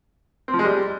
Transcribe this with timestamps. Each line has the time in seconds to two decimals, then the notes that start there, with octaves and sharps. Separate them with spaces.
0.48 C4
0.54 F3
0.59 G#3
0.65 G3